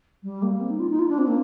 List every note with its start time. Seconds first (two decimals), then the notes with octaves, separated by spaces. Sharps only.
0.23 G3
0.42 A#3
0.60 C4
0.70 D#4
0.80 F4
0.90 D#4
0.99 F4
1.09 D4
1.18 C4
1.27 A#3